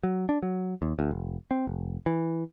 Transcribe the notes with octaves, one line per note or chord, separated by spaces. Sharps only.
F#3
D4
F#3
D#2
D2
F1
C4
F1
E3